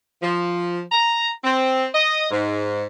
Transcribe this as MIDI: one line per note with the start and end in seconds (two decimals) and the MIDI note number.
0.22 0.81 53
0.92 1.31 82
1.44 1.87 60
1.95 2.26 75
2.31 2.86 44